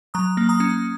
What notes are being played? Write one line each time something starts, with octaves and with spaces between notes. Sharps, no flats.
F#3 A#5 D#6
A#3
A#5 D#6
C#4